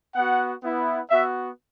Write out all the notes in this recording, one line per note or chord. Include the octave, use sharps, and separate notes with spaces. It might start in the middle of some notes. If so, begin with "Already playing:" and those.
B3 F#4 F#5
B3 E4
B3 F#4 E5